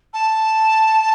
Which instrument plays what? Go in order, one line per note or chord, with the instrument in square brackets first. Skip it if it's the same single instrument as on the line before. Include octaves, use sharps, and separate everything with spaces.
[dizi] A5